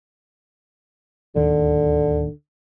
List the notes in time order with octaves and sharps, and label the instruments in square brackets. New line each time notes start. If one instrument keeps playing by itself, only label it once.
[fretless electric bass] D1 D#2 D#3 [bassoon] D3